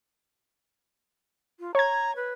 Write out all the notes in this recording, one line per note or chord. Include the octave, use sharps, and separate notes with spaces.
F4
C#5 A#5 G#6
B4